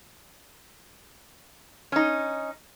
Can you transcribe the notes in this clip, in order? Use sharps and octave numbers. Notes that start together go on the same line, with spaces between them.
C#4 D#4